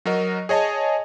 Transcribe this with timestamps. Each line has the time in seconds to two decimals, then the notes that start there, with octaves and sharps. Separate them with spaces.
0.06 F#3 F#4 A#4 D#5
0.49 G#4 C#5 D#5 G#5 A5